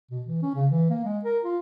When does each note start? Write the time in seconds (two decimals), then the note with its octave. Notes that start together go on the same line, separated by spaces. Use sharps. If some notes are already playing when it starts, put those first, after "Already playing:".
0.11 B2
0.27 E3
0.42 C#4
0.55 C#3
0.70 E3
0.90 A#3
1.05 G#3
1.24 A#4
1.44 F4